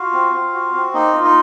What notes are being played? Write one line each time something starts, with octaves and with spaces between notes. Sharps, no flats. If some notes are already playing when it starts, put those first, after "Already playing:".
Already playing: F4 F#4 F5
C4
C4
F#4
C4
A#3 D#4 D#5
F4
D#4 D#5